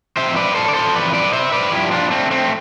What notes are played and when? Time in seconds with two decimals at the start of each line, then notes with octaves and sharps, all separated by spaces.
0.17 F2 E3 C5 E5
0.36 B4 D5
0.55 A4 C5
0.68 D5
0.74 A4 C5
0.95 F2 E3 B4 D5
1.14 B4 D5
1.33 C5 E5
1.52 B4 D5
1.71 G2 F3 E4 G4
1.91 D4 F4
2.11 A3 C4
2.31 A3 C4